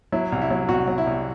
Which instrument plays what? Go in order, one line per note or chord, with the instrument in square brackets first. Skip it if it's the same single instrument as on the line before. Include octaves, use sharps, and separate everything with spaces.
[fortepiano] F#3 E4
C2
E4
F#3
C2 F#4
F#3
E4
C2